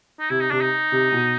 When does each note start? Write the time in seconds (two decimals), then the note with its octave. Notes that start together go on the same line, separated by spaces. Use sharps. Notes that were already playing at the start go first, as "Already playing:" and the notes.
0.20 D#4
0.30 C3 E4
0.40 D#4
0.51 C3 D4
0.61 D#4
0.92 C3
1.12 B2